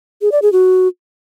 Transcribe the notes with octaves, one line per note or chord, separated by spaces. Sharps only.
G#4
D5
G#4
F#4